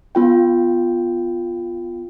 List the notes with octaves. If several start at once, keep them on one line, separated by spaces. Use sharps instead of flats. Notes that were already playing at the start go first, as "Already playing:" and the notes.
B3 F4 G5